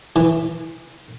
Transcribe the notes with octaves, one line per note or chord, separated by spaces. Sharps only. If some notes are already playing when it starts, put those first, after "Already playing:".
E3